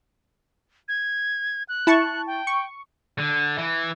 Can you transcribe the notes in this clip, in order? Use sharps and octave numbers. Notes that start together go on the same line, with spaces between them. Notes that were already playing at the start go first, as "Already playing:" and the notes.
G#6
F#6
E4 A5 C#6
G5
C#6
D3
E3